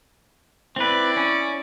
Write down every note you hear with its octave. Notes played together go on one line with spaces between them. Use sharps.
C4 E4 B4 D5
C#4